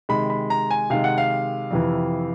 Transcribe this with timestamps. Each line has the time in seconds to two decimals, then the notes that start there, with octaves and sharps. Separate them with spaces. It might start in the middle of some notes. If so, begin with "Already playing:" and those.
0.09 C3 D#3 G#3 B5
0.30 B5
0.50 A#5
0.71 G#5
0.90 C3 D#3 G#3 F5
1.04 F#5
1.18 F5
1.71 F2 C3 E3